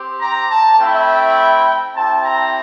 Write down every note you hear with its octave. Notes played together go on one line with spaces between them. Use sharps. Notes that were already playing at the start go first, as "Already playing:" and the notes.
Already playing: C4 G4
A#5
A5
A3 C4 E4 G5
C4 E4 G4 A5
A#5